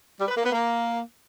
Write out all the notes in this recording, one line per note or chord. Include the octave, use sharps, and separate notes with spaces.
G3
B4
A#3
B3
A#3